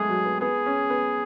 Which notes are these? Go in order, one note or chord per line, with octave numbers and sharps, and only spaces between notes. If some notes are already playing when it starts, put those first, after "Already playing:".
Already playing: G#3 A3 B3 G#4
F#3
B3
B3 G#4
C#4
B3